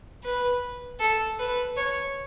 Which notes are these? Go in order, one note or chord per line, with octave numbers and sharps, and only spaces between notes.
B4
A4
B4
C#5